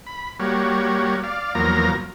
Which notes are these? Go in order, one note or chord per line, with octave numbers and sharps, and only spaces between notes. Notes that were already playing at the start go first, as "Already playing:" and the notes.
B5
G3 A#3 F#4 C#5
D5 F5
E2 F3 F#3 A#3 A#4 A#5